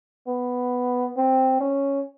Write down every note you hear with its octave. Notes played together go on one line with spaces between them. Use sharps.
B3
C4
C#4